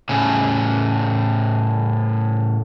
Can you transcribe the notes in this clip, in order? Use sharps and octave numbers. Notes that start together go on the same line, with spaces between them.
A2 C#3